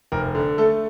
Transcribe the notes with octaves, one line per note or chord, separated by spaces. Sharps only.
F1 A#4
D3
A3 A4